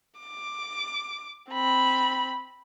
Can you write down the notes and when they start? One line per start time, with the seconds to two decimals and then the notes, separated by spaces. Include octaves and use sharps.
0.19 D6
1.50 C4 B5